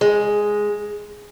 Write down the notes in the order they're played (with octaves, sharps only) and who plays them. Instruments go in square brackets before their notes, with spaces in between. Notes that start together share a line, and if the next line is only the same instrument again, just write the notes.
[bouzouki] G#3